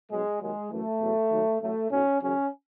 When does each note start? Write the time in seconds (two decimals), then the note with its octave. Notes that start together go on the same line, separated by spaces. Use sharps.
0.10 B1 B2 F#3 G#3
0.40 D#2 D#3 F#3 G#3
0.70 F#2 E3 A3
1.00 E2 B2 F#3
1.30 D#2 D#3 F#3
1.60 A1 A2 F#3 A3
1.90 B1 A2 F#3 C#4
2.20 G#1 F#2 C#3 F#3 C#4